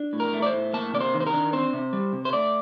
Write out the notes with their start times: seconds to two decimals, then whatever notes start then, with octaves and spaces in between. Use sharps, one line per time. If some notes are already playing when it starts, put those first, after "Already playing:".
Already playing: D4
0.13 A2
0.20 A#4
0.33 A3
0.42 D5
0.46 C5
0.53 A2
0.73 A#3 A5
0.93 C3 D5
1.01 C5
1.14 D#3
1.20 C5
1.27 A#4
1.33 D4
1.53 C4 C5
1.73 C3
1.93 G3
2.13 C3
2.25 C5
2.33 A3 D5